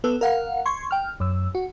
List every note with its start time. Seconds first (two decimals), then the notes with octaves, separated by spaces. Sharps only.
0.04 B3 A4 E6
0.21 A#4 F5 F#5
0.66 C6 C#6 G#6
0.91 G5 F6
1.20 F#2 E6
1.55 F#4